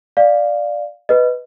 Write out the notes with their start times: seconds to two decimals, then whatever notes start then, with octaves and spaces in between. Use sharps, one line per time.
0.17 D5 F5
1.09 B4 D#5